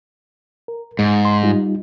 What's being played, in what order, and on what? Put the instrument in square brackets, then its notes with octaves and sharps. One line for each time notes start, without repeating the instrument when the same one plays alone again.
[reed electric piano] A#4
[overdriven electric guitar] G#2 [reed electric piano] G#3
[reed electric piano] C6
G3 D#4 F4